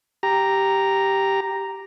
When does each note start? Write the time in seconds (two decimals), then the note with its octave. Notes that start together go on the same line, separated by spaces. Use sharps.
0.23 G4 A#5